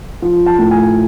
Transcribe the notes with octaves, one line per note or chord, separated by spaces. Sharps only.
F3
A5
A2
G#5